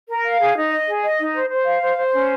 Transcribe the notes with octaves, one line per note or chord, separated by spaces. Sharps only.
A#4
F5
G#4
D#4
D#5
G#4
D#5
D#4
C5
C5
F5
C5
C5
C#4